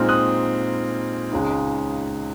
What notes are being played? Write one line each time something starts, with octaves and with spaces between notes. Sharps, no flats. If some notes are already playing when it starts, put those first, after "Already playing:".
Already playing: A#2 G#3 C4 D#4 F6
D#6 F#6
C#2 C#3 G#3 D#4